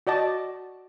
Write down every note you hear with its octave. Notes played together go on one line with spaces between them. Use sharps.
F#4 D5 D#5 A5